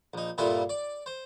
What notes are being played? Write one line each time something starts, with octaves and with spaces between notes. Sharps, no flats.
A#1 D#4
G2 A#2 E4 F4 A4 D#5
D5
C5